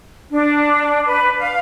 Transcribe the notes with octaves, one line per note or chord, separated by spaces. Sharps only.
D4
B4
F5